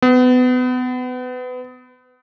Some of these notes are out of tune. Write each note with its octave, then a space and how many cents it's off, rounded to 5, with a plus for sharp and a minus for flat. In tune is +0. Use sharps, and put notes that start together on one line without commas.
B3 +30